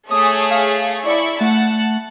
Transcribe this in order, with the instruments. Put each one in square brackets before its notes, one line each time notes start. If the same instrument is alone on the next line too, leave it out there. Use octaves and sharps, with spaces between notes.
[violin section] A3 G#4 C#5 [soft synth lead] D#6
[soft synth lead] F5
[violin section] E4 C#6 [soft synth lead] D5
[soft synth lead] A3 [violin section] F#5 A5